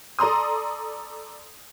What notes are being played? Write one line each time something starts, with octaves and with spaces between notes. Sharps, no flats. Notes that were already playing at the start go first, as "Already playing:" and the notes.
A4 D5 A#5 C6 D#6